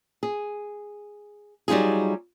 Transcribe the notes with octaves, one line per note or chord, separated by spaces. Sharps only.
G#4
F#3 G3 D#4 F4 G#4